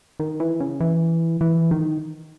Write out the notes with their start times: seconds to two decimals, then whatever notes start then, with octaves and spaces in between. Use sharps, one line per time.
0.20 D#3
0.40 E3
0.60 C#3
0.80 E3
1.41 E3
1.71 D#3